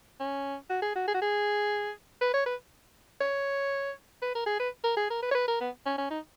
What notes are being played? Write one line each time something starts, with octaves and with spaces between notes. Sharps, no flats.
C#4
F#4
G#4
F#4
G#4
F#4
G#4
B4
C#5
B4
C#5
B4
A#4
G#4
B4
A#4
G#4
A#4
B4
C#5
B4
A#4
B3
C#4
C#4
D#4